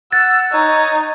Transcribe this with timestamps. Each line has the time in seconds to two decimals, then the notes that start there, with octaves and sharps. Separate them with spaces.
0.12 F#5 E6 A6
0.53 D#4 C#5